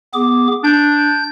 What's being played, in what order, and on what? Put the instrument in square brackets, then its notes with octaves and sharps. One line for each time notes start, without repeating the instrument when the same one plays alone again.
[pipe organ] B3 G#4 D6
[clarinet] D4 [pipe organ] G6